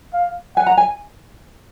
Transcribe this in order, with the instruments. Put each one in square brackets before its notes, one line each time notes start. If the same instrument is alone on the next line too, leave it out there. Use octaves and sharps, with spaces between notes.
[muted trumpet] F5
[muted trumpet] F#5 [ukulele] G#5
[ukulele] A#5
G#5